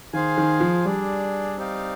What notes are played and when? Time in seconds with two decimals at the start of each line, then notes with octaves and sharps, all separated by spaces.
0.13 D#3 G#4 C5 F5 G#5
0.37 D#3
0.60 F3
0.85 G3 D4 G#4 D5
1.57 C4 D#4 G4 D5 F5